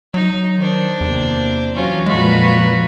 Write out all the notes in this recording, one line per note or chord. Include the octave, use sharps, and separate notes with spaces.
F#3 D#4
D#3 D4 C5
E2 C3 A#3
E3 F#3 C#4 F4 F#4
F2 A#2 G#3 F4 F#4 B4